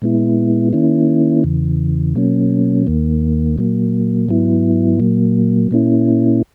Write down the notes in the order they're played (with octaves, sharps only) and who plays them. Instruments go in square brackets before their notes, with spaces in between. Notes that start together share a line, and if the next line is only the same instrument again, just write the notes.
[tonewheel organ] A#2 G#3 B3 E4
D#3 A#3 C#4 E4
E2 C#3 E3
B2 F#3 A#3 C#4
D#2 D#3 A#3
A#2 F#3 A#3
G#2 F#3 B3 E4
A#2 F#3 A#3
A#2 A#3 C#4 E4